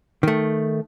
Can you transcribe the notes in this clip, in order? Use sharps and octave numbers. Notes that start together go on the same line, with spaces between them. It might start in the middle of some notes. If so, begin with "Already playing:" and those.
D#3 A3